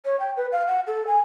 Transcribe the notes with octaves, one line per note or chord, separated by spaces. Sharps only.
C#5
G5
B4
F5
F#5
A4
G#5